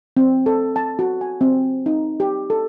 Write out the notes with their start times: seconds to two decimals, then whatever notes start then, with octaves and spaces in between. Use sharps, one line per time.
0.17 C4
0.46 A4
0.76 A5
0.99 F#4
1.21 G#5
1.41 C4
1.86 D#4
2.20 G4
2.50 A4